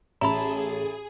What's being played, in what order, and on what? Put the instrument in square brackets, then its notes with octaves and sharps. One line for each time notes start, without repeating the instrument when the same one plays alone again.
[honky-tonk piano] A1 [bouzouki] E4 A4 [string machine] G#4 [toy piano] A#5 B5